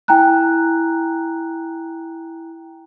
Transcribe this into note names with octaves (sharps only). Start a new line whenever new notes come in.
E4 G5 G#5 A#5 F#6